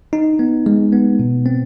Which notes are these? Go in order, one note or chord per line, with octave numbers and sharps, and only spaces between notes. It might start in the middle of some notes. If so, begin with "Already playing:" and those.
D#4
B3
G#3
B3
B2
C4